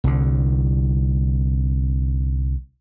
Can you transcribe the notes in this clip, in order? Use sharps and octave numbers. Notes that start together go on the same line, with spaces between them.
C2 D3